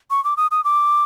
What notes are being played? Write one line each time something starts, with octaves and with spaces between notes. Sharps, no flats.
C#6
D6
D#6
D#6
D6